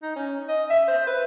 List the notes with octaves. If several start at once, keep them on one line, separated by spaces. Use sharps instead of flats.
D#4
C#4
D#5
E5
C5
B4